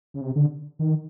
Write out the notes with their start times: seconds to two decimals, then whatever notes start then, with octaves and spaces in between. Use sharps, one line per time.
0.14 C#3
0.21 C3
0.36 D3
0.79 D#3